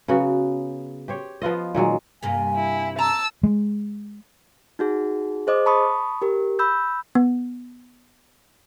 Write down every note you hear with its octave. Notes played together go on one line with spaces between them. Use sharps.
C#3 F#3 B3 F#4
G4 C5 C#5
F3 B3 F4 D#5
A#2 D#3 F#3 G#3
G2 C3 A#3 G#5
E4
A5 A#5 E6
G#3
D#4 F#4 G#4
G#4 C5 D#5 D6
A5 B5 C#6 D#6
G4 A#4
B5 E6 G6
B3